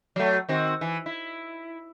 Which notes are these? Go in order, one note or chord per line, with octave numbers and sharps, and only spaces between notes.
F#3 A3
D#3 C4 F#4
E3
E4